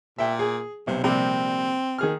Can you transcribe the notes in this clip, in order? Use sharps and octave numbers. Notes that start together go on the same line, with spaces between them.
A#2 E5 G5
G#4
B1 C3
A#1 C3 G3 C4
D#3 G#4 F6